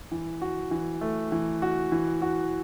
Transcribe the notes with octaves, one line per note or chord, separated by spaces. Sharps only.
E3
F#4
E3
A3
E3
F#4
E3
F#4